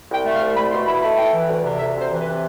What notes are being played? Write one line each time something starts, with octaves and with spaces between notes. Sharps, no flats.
C2
G5
A3
F5
C2
A3 B5
B2 C6
E4 B5
A3 B5
E3 G5
E3
D2
C3
D2 E5
C3
C5
E3
B4
C3